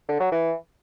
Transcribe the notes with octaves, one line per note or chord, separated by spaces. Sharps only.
D3
F#3
E3